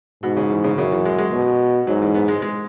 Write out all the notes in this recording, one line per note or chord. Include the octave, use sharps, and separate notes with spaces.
G#2 B2
C#3
E3
C#3
F#2 C#3
E3
G#3
G#3
B2
G#2 F#3
E3
B3
G#3
G#3